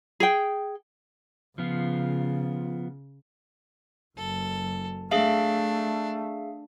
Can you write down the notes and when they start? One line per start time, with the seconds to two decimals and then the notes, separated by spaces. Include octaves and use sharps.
0.20 G#4 G5
1.58 C#3 F3 B3 F4
4.17 F#1 A4
5.11 A3 D4 G#4 E5 F5